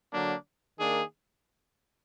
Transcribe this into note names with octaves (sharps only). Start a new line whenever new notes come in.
D3 F#3 A#3 D4
D#3 A#3 D4 G#4